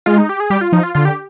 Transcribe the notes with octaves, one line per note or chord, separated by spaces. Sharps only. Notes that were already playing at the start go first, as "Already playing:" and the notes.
G#3 F4
D#4
G4
G#4
G3 G4
F4
F3 D#4
F4
D3 F4
G4